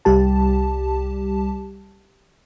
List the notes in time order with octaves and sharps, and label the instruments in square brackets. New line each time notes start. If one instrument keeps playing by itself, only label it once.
[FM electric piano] C2 G3 G4 A5